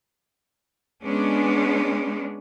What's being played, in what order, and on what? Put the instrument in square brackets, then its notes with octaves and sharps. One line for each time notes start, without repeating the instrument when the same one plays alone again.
[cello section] G#3 B3 C#4 D4